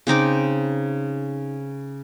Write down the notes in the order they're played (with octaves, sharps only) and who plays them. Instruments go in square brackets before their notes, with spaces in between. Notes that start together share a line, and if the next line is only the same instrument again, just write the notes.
[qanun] C#3 C4 D#4 D6